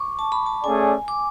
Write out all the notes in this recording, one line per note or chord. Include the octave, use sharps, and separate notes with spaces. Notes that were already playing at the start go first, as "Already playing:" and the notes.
Already playing: C#6 D6
A5
B5
A5
A3 C#4 G#4 D5 G#5
D6